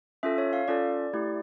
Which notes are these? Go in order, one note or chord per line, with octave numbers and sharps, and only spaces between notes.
C#4 F4 A4 E5
C#5
F5
C#4 F4 A4 D5
A3 E4 G4